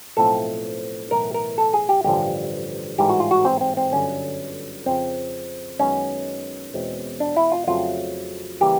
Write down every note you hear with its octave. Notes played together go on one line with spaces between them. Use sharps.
B1 A2 F3 A3 C4 A4
B1 A2 E3 A#4
A#4
A4
G#4
G4
A1 G2 D3 F3 G4
A1 G#2 E3 G3 G4
F#4
F4
F#4
C4
C4
C4
G1 F#2 D3 C#4
F2 C#3 F3 C4
F#2 D#3 G#3 B3 C#4
E2 B2 G#3 C4
D4
E4
F4
F2 C#3 F#3 A3 C4 F4
C#3 E3 G3 A#3 G4